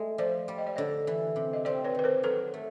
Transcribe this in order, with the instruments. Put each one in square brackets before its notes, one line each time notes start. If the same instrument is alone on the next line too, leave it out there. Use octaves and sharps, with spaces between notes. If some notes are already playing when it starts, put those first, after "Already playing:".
Already playing: [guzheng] G#3 A3
[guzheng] F3 [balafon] C5 D5
[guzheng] G3
[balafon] D#5
D5
[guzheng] D3 [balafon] C#5 D#5
[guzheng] E3
C3
[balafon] D#5
[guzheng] C4 [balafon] C5 D5
[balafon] B4 C#5
[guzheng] D#3 [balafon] B4
[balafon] A#4 C5
[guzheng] F#3 [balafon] A4 B4
[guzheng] A3